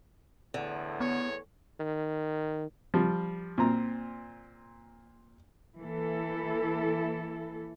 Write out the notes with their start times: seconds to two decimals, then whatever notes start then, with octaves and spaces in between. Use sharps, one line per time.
0.54 E2 A2 D3
1.00 B3 C#5
1.80 D#3
2.94 F3 G3
3.58 A#2 C4 A#5
5.78 E3 A#3 E4 A4